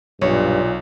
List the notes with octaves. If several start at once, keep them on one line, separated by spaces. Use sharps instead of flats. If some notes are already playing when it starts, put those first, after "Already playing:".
B1 G2 A#2 C#5